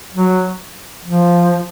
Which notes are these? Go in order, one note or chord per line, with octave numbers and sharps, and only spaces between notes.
F#3
F3